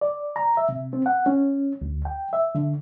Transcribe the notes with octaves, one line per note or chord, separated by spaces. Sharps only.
D5
A#5
E5
C3
C4
F#5
C#4
D2
G5
E5
D3